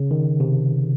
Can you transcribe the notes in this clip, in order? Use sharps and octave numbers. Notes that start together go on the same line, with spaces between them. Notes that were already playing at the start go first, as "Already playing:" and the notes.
Already playing: C#3
D#3
C3